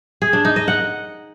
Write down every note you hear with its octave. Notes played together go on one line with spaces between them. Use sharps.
G#4
D4
D#4
D#5
F#5